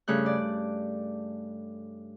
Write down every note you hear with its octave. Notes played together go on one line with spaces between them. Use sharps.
G2 C#3 A3 F#6
D5